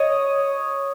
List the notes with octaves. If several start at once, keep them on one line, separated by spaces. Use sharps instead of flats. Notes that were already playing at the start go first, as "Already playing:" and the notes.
Already playing: C#5 D#5